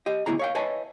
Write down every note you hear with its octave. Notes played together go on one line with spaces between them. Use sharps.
G4 D#5
D2 B2 E4 G#4 A#5
C#5 F5 G5
B4 C#5 D#5 E5 G#5 A5